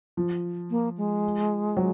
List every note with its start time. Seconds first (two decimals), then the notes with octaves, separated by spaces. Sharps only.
0.17 F3
0.70 A#3
0.98 G#3
1.77 F#3